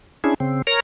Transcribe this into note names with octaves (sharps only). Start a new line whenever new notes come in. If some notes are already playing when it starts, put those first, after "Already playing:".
C#4 D4 E4 G#4
C#3 C4
A#4 C#5 A#5